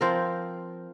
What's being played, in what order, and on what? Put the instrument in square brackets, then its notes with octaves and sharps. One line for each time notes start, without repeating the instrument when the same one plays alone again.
[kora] F3 C4 F4 A#4